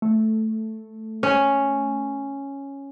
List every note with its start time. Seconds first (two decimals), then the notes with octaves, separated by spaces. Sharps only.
0.02 A3
1.23 C#4